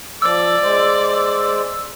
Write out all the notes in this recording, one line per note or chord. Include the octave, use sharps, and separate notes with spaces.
F3 D5 E6
G#3 C5